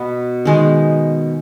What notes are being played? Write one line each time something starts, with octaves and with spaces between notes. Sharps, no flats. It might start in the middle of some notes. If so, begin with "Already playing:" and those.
Already playing: B2 B3 B4
D#3 G#3 B3